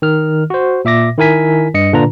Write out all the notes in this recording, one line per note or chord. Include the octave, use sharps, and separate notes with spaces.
D#3 F6
F#4 C5
A#2 E5 D6 A#6
D#3 E4 A#4 G#5 B6
G2 D#5 C#7
A#2 D3 D4 F4 B4 A#5